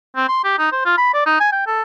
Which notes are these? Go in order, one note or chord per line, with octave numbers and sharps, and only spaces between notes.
C4
C6
G4
D#4
C5
F4
B5
D5
D#4
G#5
G5
A4